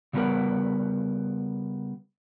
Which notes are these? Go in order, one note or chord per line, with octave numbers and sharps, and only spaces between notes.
C#3 F#3 G3 B3 A#4 B4